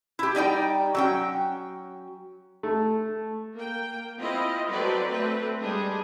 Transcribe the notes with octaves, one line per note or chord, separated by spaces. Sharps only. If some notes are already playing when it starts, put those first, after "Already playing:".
E4 G4
G3 D#4 D5 G5
F#3 C#4 G5
A3
A#3 G5
C4 E4 F4 D#5
F#3 C4 A4 B4 D5
A3 C4 B4
G3 G#3 D4 G#4